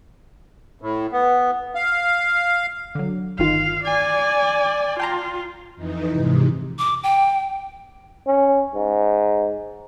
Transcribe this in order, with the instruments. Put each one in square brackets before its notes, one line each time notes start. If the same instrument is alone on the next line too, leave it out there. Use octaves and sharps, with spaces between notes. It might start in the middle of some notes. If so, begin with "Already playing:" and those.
[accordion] A2
B3
F5
[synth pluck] D3 F#3
[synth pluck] G1 D#3 F4 [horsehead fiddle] F5
[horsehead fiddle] D5 G#5
[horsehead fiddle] F4 [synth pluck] G5 A5 A#5
[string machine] F2 E3 D#4
G#2 C3
[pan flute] D6
G5
[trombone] C#4
G#2